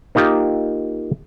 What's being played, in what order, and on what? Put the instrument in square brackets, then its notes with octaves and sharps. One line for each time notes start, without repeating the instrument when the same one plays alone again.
[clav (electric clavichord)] A#3 D#4 F4 G4